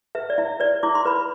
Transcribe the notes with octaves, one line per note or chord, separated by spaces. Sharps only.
B4 E5
D5
E4 E5
B4 D5
E4 D6
C6
B4 B5